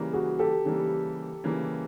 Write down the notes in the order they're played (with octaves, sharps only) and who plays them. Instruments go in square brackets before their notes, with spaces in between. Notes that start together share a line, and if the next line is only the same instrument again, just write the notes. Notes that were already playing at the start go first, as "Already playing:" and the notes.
Already playing: [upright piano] C#3 E3 G3 A#3
[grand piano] F#4 G#4
G4 A4
[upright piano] C#3 E3 G3 A#3
C#3 E3 G3 A#3